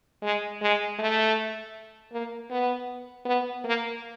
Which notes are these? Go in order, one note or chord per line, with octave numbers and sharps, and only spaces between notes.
G#3
G#3
A3
A#3
B3
B3
A#3